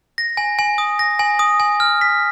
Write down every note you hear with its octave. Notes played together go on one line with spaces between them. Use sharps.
A#6
G#5
G#5
D#6
A#6
G#5
D#6
G#5
F6
B6